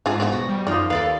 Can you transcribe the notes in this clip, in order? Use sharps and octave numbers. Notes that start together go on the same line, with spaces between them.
G#2 D4 F4 G#4
F3 B3
E1 F#4
G3
F#2 F3 D#4 F4 D5
D#2 A4 B4 D5 F5